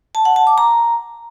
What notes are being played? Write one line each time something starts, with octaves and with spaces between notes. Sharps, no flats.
A5
F#5
A5
D6
A#5